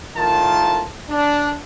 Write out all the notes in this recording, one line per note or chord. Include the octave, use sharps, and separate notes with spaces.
A2 D#3 F4 A#4 A5
D4